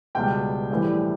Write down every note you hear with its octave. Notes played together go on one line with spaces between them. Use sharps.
C#2 B2 G3 G5
A#1 A2 E3 G3